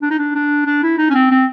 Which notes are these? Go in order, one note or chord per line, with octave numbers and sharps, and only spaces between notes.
D4
D#4
D4
D4
D4
E4
D#4
C#4
C4
C4